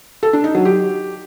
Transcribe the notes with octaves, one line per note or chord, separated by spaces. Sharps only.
A4
D4
D#4
F#3
G4